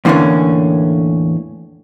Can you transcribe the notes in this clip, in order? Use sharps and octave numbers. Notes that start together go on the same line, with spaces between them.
E2 A2 D3 E3 A#3 C#4